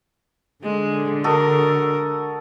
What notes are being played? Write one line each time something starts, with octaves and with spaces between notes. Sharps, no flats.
D3 G#3
F#4 A4 A#4 D#5